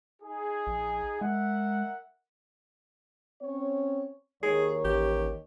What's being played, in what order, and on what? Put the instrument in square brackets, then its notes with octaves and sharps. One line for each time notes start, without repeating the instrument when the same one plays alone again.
[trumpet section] D#4 G#4
[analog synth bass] A#1
[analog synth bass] G#3 [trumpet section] A#4 E5 F#5
[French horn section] C4 C#4 C#5
[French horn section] D#2 D#3 C#5 [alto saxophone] G#4
[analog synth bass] A1 [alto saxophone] G4